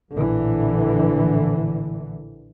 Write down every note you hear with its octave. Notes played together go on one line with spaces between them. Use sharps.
A#1 A2 D3 E3